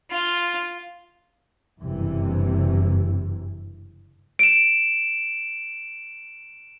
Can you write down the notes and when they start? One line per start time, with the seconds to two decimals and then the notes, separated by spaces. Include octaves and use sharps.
0.11 F4
1.82 F#1 G2 C3 E3
4.39 D7 E7